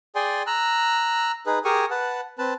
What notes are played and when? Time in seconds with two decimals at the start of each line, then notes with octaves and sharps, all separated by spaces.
0.15 G#4 D5 G5 G#5 C6
0.47 A#5 E6 F#6
1.46 D#4 G#4 B4
1.65 G4 G#4 A#4 G#5 C#6
1.91 B4 F#5 A5
2.38 C4 B4 A5